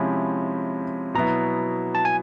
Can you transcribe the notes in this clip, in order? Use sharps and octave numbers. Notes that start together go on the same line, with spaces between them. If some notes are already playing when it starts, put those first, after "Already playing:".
Already playing: C3 F3 G#3 C#4 E4 B5
B2 F#3 B3 E4 A#5
A5
G#5